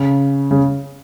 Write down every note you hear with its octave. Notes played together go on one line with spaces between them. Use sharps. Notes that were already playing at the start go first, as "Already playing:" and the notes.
Already playing: C#3
C#3